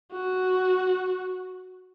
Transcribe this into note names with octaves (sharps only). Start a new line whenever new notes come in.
F#4